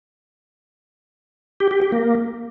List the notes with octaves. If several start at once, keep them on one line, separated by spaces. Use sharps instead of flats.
G4
G4
G4
A#3